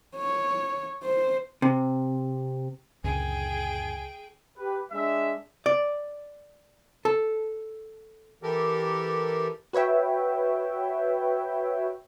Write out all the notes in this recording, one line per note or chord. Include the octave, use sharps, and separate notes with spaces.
C#5
C5
C3
C#2 F#2 A#2 D3 G#4 G5 G#5
G4 B4
G#3 D4 E5
D5
A4
E3 G4 A4 A#4
F#4 B4 C#5 E5 G5